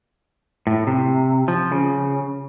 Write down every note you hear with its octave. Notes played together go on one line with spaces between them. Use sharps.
A2
C3
F3
C#3